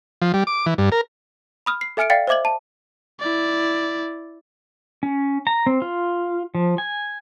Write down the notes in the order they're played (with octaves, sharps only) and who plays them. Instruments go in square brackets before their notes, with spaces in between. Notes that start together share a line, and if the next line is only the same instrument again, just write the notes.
[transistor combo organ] F3
G3
D6
E3
G2
A#4
[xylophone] B5 D#6 F6
C7
A4 E5 G#5 F6 C#7 D7
D5 F5 G5 A6 C7 C#7
C5 D#5 E5 D6 G#6 F#7
A5
[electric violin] E4 D5
[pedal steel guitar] C#4
A#5
C4
F4
F3
G#5